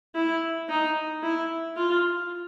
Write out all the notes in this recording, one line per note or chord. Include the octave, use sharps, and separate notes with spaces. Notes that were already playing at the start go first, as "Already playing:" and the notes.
E4
D#4
E4
F4